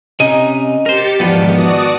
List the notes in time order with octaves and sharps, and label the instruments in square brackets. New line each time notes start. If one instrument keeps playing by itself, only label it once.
[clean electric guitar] C3 C#4 G#5 [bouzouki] D#4
[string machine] G4 A6 C#7 [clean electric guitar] A#4 C5
[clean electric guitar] E2 F3 [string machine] G#2 D#3 [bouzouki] B3 D4
[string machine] F#4 D5 D#6